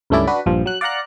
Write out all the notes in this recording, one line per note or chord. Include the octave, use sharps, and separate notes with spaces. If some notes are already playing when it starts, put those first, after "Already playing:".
C#2 G2 A3 C#4 E4 D5
D4 F#4 B4
A#1 G2 F3
F#3 F#6
D5 F5 F#5 A#5 F#6